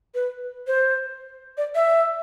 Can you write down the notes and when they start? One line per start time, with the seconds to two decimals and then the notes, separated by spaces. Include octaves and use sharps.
0.15 B4
0.67 C5
1.57 D5
1.75 E5